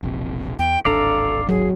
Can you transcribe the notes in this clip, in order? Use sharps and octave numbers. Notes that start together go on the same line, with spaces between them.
E1 A#1 C3
E2 G5
D1 G#1 D4 A4 D5 F5 A#5
F#3 G#4